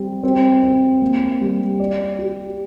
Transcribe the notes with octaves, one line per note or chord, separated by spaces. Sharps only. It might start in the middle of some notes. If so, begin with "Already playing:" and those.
Already playing: G3 C4
C4
C4
A#3
G3
D5
G4